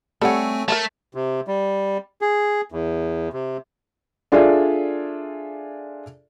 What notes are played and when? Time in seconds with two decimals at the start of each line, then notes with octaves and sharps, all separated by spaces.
0.21 G3 A3 C4 A4 C#5 F#5 G#5
0.68 A3 A#4 E5 A5
1.15 C3
1.48 G3
2.22 G#4
2.72 E2
3.33 C3
4.32 D4 F4 G#4 A4 D5 E5